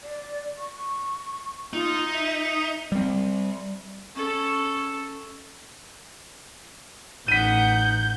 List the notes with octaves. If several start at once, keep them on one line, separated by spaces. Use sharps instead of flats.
D5
C#6
D#4 F4
E5
G3 C4
C#4 A4
A1 D#4 F#5 G6 B6 D#7